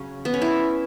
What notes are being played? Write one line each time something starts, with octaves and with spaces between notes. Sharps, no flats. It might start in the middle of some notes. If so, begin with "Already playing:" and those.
Already playing: C#3 F#3 C#4
B3
C#4
E4